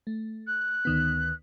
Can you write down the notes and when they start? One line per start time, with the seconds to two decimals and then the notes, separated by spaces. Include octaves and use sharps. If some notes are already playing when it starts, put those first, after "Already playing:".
0.07 A3
0.47 F#6
0.85 D2 D#3 B3